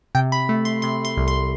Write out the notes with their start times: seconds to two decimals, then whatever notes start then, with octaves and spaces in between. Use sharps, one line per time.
0.15 C3 G5
0.32 B5
0.49 A3
0.65 C6
0.82 C3 C6
1.05 C6
1.17 C2
1.28 C6